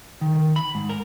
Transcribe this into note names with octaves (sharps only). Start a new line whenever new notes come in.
D#3
D#3
B5
G#2
A#4